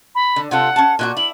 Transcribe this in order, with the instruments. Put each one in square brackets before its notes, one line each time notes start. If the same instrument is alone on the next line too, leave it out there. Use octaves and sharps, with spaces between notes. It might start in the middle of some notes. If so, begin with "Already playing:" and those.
[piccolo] B5
[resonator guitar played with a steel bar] D3
[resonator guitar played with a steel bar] C3 F4 A4 [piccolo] F#5
[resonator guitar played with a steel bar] C#4 A5
[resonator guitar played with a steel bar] A#2 E4 F#4 [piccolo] F#6
[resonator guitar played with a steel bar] E4 [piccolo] F#7